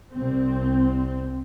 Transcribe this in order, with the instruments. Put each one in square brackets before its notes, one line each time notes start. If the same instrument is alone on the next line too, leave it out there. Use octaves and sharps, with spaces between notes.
[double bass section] C2 C4